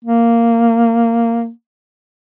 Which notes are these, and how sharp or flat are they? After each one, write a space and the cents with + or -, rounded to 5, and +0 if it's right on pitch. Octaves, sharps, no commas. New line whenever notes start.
A#3 -10